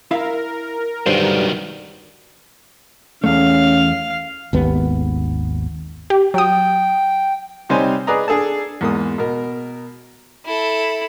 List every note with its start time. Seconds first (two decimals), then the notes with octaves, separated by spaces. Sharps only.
0.11 E4 A#4 E5 F5
1.06 G2 D3 D#3 F#3 F4 C5
3.24 E2 A3 C#4 F5
4.53 G#1 D#2 B3
6.10 G4
6.34 F#3 G5 D#6
7.70 C3 G3 D#4 C5 C#5 G#5
8.07 G#4 B4 D5 D#5 A#5
8.28 D4 G#4 A4 A5
8.81 E2 G#2 A#3 D#6
9.18 B2 A#4
10.45 E4 A4